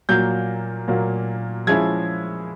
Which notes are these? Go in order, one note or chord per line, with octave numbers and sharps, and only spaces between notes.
A#2 F#3 A#3 G6
A#2 F#3 A#3
F3 G#3 C#4 E4 G#6